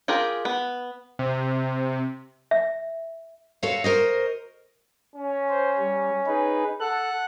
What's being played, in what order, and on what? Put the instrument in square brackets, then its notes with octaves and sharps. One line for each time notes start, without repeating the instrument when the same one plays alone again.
[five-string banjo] F4 G4 G#4 A#4
B3
[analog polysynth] C3
[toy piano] E5
[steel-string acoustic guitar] F#4 A4 C5 C#5 F5
F#4 A#4 C5 D#5
[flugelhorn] C#4
[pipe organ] C5
G3
D#4 G#4 B4
[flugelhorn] A4 [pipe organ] F#5 F#6